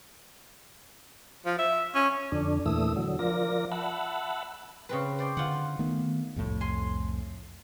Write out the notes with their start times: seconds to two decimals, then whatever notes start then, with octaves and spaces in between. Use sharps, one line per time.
1.46 F3
1.59 E5
1.95 C#4
2.32 F2 D3 D4
2.66 E2 A#2 E3 A3 D#6 E6
2.96 D3 F#3
3.19 F3 F4 A#4 D5 A#6
3.72 E5 F#5 A5 B5
4.89 C#3 C4 B4
5.19 C5 D5 G5
5.37 D3 F4 F#5
5.79 D#3 A3 B3
6.36 C2 F2 A2
6.61 G#5 C6